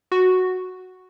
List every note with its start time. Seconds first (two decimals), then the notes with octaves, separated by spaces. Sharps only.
0.11 F#4